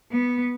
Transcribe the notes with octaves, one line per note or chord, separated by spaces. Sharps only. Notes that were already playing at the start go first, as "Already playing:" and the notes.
B3